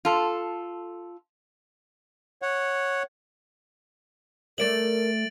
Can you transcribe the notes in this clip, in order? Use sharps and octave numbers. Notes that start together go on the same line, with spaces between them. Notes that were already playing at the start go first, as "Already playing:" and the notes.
F4 A4
C#5 F#5
A3 A#4 D5 E5 A6 D7 F#7